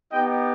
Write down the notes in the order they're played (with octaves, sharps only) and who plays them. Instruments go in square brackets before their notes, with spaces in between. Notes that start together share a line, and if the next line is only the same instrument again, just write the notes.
[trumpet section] B3 D#4 G4 D#5 G5